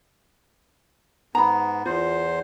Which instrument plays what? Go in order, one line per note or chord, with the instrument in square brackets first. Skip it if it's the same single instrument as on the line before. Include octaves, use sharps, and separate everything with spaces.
[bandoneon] G#2 B3 [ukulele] A#5 B5
[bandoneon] E2 C5 [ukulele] F4